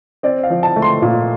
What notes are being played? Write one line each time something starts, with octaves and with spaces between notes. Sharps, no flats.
C4 D5
F5
F3
A5
A3
C6
A#2